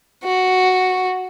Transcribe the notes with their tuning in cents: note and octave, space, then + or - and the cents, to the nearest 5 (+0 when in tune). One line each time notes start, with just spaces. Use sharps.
F#4 +0